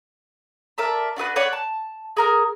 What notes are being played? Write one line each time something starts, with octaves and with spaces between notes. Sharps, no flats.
A#4 D5 E5 A5
D4 F#4 G#4 B4
B4 C#5 D5 F#5
A5
G#4 A#4 F6